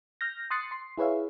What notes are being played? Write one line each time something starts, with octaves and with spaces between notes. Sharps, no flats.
F6 G6 A#6
C6 D#6 F#6 A6 C7 C#7
C6 C7
E4 G#4 B4 C#5 E5 F5